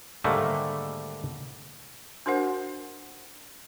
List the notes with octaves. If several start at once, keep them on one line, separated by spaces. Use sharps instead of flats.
G#2 D3 D#3 G3 A3 A#3
D4 F#4 A#4 C5 F#5